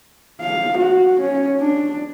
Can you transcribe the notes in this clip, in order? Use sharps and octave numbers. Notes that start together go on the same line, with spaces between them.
F5
F#4
C#4
D4